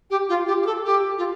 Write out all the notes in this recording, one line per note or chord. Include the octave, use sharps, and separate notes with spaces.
G4
F4
G4
G4
A4
G4
F4